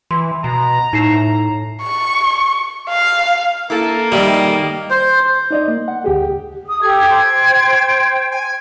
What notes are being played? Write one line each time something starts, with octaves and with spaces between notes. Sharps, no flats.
E3 C6
B2 A#5
A2 D#4 C7 E7
C#6
F5
A#3 E4 A4
G#2 D#3 G3 A3 E5
C5
D#4 D5 D#5
A#3
F#5
D2 G4 G#4
D#6
G4 A4 G#6
C5 G5
G#5